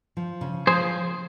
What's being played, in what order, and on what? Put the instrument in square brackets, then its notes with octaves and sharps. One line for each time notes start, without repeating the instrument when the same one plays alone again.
[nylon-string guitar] F3
C#3
[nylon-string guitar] F3 [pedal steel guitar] G#4 C5